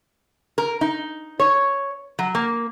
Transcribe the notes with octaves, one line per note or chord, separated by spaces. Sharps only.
A#4
D#4
C#5
F#3
A#3